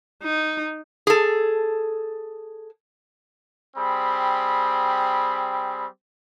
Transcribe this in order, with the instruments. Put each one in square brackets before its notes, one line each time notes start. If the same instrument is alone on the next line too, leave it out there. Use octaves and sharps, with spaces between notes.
[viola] D#4
[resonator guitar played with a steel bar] G#4 A4
[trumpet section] G3 C4 G#4 B5